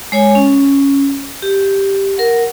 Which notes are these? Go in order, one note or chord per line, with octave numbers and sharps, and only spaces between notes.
G#3 C#5 G#5
C#4
G4
A#4 F#5